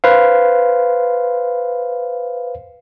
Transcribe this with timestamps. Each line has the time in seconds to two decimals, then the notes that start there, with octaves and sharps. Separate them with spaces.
0.04 B4 C5 F5